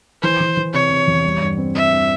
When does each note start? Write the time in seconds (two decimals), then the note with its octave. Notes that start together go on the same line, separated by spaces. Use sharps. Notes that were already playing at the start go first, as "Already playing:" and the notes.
0.22 E3 C5
0.40 E3
0.57 E3
0.73 C3 C#5
0.91 C3
1.07 E2
1.24 G3
1.41 G2
1.58 C4
1.75 C4 E5
1.91 G2